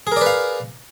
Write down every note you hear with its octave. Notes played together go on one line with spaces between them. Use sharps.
G#4 A#4 B4 D5 F5